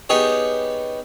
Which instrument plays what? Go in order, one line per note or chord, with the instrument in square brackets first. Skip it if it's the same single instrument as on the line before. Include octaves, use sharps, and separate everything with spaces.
[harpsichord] B3 D#4 G4 G#4 C#5